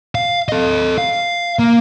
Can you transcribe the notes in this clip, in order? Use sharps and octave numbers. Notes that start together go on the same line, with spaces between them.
F5
A4 D#5
F5
A#3